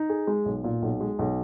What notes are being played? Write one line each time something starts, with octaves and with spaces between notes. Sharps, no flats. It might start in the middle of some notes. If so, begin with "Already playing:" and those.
Already playing: D#4
G#4
G#3
B1
A#2
B1
G#3
B1